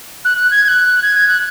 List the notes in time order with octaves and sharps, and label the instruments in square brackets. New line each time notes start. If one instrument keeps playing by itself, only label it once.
[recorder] F#6
F#6
G#6
G#6
F#6
G#6
G#6
F#6